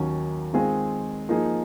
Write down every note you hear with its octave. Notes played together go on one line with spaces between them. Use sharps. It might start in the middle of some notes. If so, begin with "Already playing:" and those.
Already playing: D#2 D#3 F#3 C#4
D#3 G#3 C4 F4 G#4
F3 A#3 D#4 G#4